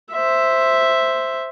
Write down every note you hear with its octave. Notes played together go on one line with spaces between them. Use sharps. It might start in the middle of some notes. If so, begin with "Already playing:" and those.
C5 E5